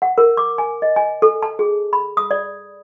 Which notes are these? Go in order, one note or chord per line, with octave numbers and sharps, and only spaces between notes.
F#5
A#4
D6
G#5
D#5
G#5
A4
A5
G#4
B5
D#6
D5